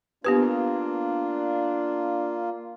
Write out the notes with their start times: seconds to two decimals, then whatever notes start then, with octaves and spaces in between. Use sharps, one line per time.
0.24 A#3 B3 D4 F4 G4 B4